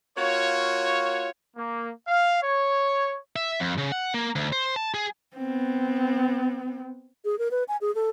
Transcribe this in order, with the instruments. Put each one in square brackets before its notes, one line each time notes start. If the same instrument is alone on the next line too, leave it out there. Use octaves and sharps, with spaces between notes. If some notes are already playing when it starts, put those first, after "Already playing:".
[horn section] A#3 F4 F#4 C#5
[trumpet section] A#3
F5
C#5
[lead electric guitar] E5
F2
C#3
F#5
A#3
D2
C5
A5
G#4
[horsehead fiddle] B3 C4
[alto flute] G#4
A#4
B4
G#5
G#4
A4